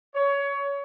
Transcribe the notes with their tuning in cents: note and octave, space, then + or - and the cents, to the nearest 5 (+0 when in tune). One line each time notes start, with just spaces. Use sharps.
C#5 +20